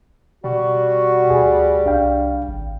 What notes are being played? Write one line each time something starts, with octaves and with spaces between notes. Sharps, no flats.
B2 G3 F#4
D2 G#4
C2 D4 F5 G5
G#1